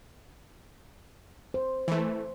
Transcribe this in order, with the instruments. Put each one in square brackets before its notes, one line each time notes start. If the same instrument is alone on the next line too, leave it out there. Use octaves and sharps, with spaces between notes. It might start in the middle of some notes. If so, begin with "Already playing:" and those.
[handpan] C5
[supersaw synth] E3 A3